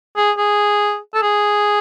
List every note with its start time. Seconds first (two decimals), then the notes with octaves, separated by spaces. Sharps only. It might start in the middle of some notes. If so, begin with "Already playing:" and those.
0.17 G#4
0.38 G#4
1.14 A4
1.22 G#4